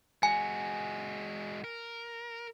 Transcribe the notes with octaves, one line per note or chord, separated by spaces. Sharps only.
G#3 F#4 G#5
A#4